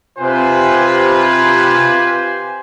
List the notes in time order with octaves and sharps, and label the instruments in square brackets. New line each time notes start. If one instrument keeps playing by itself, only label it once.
[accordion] C3 [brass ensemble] F4 B4 [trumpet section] G4 C5 G#5